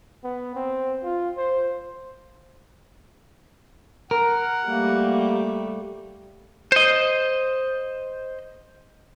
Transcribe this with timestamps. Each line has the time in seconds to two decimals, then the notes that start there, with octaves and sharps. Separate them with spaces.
0.24 B3
0.55 C4
1.03 F4
1.37 C5
4.11 A#4 F#5
4.67 G3 A3 A#3
6.72 C5 D#5